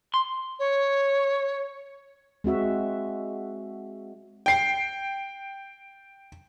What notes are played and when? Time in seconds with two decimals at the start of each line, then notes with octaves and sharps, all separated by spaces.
0.14 C6
0.59 C#5
2.44 G#3 C4 F#4 E5
4.46 G5 C7